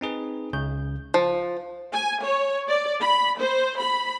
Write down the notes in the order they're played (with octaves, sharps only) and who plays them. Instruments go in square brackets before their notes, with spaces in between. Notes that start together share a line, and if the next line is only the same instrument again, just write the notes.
[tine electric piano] C4 D#4 G#4 B4
C#2 C#3 G6
[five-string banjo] F3
[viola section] G#5
C#5
D5
B5
C5
B5